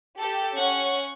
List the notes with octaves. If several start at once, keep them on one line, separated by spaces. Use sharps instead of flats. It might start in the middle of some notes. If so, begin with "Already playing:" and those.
G4 A4
C#4 F#5 C#6